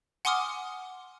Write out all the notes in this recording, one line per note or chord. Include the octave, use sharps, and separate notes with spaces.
F#5 G#5 C6 D6 D#6 F6